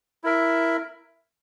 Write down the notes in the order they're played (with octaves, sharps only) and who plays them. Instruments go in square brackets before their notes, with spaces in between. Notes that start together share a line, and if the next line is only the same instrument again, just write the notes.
[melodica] E4 A#4 E5